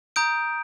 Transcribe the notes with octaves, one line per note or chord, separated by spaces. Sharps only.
A#5 D#6 G6 D7